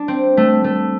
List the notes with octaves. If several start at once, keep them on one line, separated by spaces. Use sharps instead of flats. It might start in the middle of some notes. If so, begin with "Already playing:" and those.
Already playing: D4
C4
A3
A3